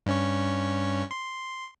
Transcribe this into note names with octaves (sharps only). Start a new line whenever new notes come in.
G2 C#4 C#5
C6